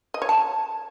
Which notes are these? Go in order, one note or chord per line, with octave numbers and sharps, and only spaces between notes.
D#5
C#5
A5